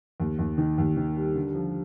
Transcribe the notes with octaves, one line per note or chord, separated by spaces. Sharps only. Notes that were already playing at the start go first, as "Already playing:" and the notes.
D#2
D#2
D#3
D#2
D#3
G3
D3
F3